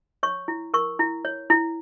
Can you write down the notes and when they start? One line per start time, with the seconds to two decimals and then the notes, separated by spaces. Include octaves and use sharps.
0.23 C#5 C#6
0.48 E4
0.74 A#4 C#6
0.99 E4
1.25 C#5
1.50 E4